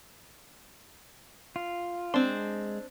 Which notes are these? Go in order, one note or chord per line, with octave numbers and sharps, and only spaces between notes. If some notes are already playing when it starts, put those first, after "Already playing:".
F4
G#3 C4 D4 C6